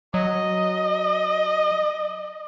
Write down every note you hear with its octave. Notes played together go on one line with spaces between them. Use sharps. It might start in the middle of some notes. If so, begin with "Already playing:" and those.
F#3 D#5